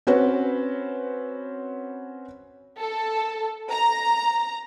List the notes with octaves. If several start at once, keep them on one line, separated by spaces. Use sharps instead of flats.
C4 C#4 F#4 B4
A4
A#5